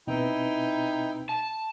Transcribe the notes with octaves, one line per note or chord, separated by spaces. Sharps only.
B2 C4 D#4 E4 B4 G5
A5